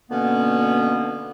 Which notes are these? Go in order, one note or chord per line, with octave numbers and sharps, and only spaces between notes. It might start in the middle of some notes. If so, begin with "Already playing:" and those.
B2 D3 A#3 B3 C#4